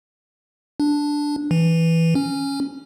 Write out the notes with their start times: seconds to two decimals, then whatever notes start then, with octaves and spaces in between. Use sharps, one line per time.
0.80 D4
1.51 E3
2.15 C#4